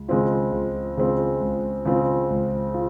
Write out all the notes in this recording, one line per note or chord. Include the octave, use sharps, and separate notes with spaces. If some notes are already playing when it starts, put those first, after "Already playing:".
Already playing: C#2
C#3 G#3 C4 F4
C#2
C#3 G#3 C4 F4
C#2
C#3 G#3 C4 F4
C#2
F4